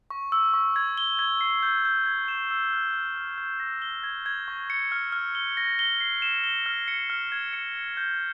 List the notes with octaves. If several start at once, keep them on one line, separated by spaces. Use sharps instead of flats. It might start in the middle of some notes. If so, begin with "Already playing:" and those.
C#6
E6
C#6
G#6
G7
G#6
C7
G6
G6
G#6
E7
E6
F6
F6
F6
G6
A#6
G7
G#6
G#6
C#6
C#7
F6
F6
G7
A#6
G7
C7
E7
G7
F6
C#7
F6
G#6
C#7
C#7
G6